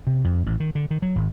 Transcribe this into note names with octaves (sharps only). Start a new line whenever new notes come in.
C3
F2
A1
D#3
D3
D#3
F#3
G#1